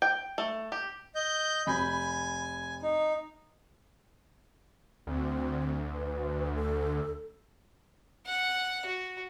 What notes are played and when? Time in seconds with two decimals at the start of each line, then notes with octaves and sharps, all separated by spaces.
0.02 G5
0.38 A3
0.72 G4
1.15 D#5 G6
1.67 F1 G#5 B5 G6
2.82 D#4
5.07 D2 C4
5.94 B4
6.55 A4
8.26 F#5
8.85 F#4